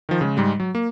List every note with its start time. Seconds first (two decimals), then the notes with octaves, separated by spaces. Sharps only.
0.09 D#3 F3
0.21 C#3 G#3
0.37 G#2 G3 G#3
0.60 F#3
0.75 A#3